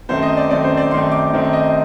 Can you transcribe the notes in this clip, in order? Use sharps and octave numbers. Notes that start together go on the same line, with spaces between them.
F#2 D#3 A3 C4 C5
D#5
D5
F#2 D#3 A3 C4 D5
C5
D5
F#2 D#3 A3 C4 C6
D6
F#2 D#3 A3 C4
D#5